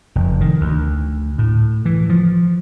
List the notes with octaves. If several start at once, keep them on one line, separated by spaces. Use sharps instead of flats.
F1
D#3
D2
A2
E3
F3